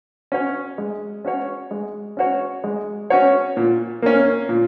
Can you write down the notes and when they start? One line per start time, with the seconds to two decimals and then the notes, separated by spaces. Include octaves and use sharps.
0.32 C#4 F#4 C#5
0.78 G#3
1.25 C#4 F#4 C#5
1.71 G#3
2.17 C#4 F#4 C#5
2.64 G#3
3.10 C#4 F#4 C#5
3.57 A#2
4.02 A#3 C#4
4.49 A#2